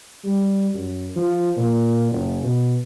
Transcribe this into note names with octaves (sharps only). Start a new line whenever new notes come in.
G3
F#2
F3
A#2
F#1
B2